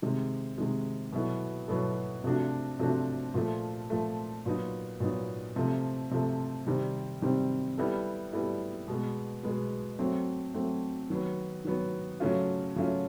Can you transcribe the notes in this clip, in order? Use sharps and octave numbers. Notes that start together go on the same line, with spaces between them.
C3 D#3 G#3
C3 D#3 G#3
B2 F#3 B3 E4 A4
B2 F#3 B3 E4 A4
C3 F3 A3 D4 F#4
C3 F3 A3 D4 F#4
A#2 F3 A3
A#2 F3 A3
A#2 F#3 B3 D#4
A#2 F#3 B3 D#4
C3 F3 A3
C3 F3 A3
C3 D#3 G3 C4
C3 D#3 G3 C4
G3 B3 E4 A4
G3 B3 E4 A4
B2 G#3 B3
B2 G#3 B3
F#3 A3 C4
F#3 A3 C4
D#3 F#3 B3
D#3 F#3 B3
C#3 F#3 A3 C#4 F4
C#3 F#3 A3 C#4 F4